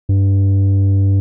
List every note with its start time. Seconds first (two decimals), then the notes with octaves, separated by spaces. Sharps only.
0.09 G2